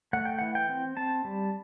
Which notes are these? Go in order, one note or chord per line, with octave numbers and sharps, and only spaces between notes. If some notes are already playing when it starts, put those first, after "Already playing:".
A3 F#5
G5
E3 F#5
G5
C4
C4 A5
G3